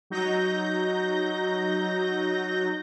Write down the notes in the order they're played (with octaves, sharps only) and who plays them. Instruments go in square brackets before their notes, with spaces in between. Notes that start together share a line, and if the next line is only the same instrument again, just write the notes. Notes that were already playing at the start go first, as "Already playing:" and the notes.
[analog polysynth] F#3 D#4 G6 A#6